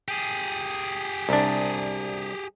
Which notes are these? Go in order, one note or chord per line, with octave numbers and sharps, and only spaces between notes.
G4 G#4
C2 D4